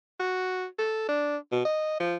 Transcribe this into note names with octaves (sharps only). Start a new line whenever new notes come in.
F#4
A4
D4
B2
D#5
F3